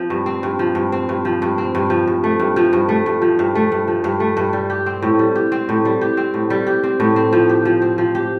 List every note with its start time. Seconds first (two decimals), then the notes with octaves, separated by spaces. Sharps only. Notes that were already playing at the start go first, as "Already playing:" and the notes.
Already playing: F3 C4
0.10 G2
0.26 C4
0.43 G2
0.59 F3
0.75 G2
0.92 C4
1.09 G2
1.25 F3
1.42 G2
1.58 C4
1.75 G2
1.90 F3
2.07 G2
2.24 A3
2.40 G2
2.56 F3
2.73 G2
2.89 A3
3.06 G2
3.22 F3
3.39 G2
3.55 A3
3.72 G2
3.88 F3
4.04 G2
4.20 A3
4.37 G2
4.53 G3
4.70 G4
4.86 C4
5.02 A2
5.19 G3
5.36 G4
5.52 C4
5.69 A2
5.85 G3
6.01 G4
6.17 C4
6.34 A2
6.50 G3
6.67 G4
6.84 C4
7.00 A2
7.16 C4
7.33 F3
7.49 G4
7.65 F3
7.82 C4
7.98 F3
8.15 G4